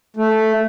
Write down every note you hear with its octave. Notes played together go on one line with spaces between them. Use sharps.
A3